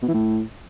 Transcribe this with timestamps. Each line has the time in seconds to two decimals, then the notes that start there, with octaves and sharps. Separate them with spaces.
0.02 B2
0.08 E3
0.14 A2